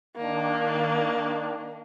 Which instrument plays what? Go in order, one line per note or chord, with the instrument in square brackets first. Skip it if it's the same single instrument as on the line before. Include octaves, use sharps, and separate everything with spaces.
[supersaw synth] D#3 D4 [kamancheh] A#3